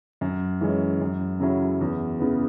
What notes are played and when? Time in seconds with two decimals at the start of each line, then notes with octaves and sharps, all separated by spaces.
0.21 F#2
0.61 E3 G#3 C#4
1.01 F#2
1.40 C#3 F#3 C#4 E4
1.81 E2
2.20 C#3 E3 B3